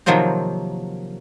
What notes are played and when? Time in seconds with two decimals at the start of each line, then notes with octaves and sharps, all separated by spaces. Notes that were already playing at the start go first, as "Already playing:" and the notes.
0.06 C3 D#3 F3 F#3 A#3 C4